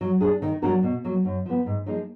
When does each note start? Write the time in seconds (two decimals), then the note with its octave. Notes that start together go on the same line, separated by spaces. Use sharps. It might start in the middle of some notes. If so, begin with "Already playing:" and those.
0.01 F#3
0.21 D4 G#4
0.42 D#3
0.62 F#3 D4 F#4 A#4
0.83 B2
1.04 F#3 A#3
1.25 F#2
1.45 F3 B3
1.66 G#2
1.86 F3 A#3 D#4 G#4